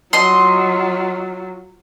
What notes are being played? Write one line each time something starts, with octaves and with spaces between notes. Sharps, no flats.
F#3 F4 D#5 C6